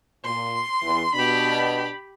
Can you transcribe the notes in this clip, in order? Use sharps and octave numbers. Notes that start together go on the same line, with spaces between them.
A#2 C6
E2 E3
B2 D4 G4 B5